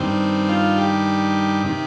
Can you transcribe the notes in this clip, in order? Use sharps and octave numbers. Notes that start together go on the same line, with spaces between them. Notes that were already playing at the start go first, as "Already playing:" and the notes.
Already playing: G2 D#3 C4
F4
G4
C3 D#3